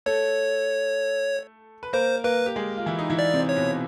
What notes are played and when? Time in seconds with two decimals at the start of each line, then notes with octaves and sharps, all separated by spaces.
0.06 A3 A4 C#5
1.83 B4
1.93 A#3 A#4 C5
2.24 A#3 A#4 B4
2.46 G4
2.56 G#3 G#4
2.77 F4
2.86 E3 E4
2.99 D#4
3.10 E3 E4
3.19 D5
3.34 C3 C4
3.49 C#5
3.56 B2 B3